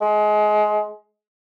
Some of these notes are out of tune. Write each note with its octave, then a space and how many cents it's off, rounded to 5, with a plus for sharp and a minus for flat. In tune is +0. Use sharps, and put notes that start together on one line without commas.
G#3 +25